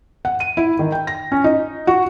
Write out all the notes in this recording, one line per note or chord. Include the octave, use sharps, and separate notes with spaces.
F#5
D#7
E4
D#3
G5
A#6
C#4
D#4
F#4